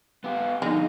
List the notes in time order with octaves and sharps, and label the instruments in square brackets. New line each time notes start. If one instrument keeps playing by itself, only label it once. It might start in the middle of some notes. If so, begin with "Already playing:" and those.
[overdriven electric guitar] B3 G4 [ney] F5
[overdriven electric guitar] F2 D3 [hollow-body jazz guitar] B2 D#4 [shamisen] G#3